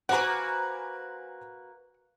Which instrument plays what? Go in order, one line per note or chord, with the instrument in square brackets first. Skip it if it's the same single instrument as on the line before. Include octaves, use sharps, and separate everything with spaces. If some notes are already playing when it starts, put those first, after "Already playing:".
[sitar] A#3 F#4 B4 [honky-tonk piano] C5 G#5 A#5 [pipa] F#5